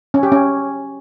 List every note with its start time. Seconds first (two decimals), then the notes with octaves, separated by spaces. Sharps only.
0.14 C#4
0.23 G4
0.32 C#4